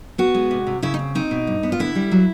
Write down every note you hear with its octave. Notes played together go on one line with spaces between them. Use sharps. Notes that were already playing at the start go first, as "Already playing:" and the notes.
B3 F#4
G#3
C3
C3
C#3 E4
D#4
C4
C4 D#4
B2
G2
B3
F4
D3 E4
G3
F#3